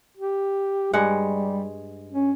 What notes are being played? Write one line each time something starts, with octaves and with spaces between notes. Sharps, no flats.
G4
G2 G3 G#3 F#5
C#4